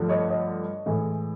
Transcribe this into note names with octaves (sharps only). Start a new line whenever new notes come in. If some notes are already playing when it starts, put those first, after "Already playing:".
Already playing: G2 D3 F3 A3
C#5 D#5
C#5 D#5
A2 E3 G#3